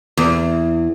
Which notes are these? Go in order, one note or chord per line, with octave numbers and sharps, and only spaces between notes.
E2